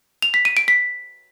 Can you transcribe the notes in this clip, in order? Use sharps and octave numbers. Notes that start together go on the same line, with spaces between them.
F7
B6
D#7
D7
B6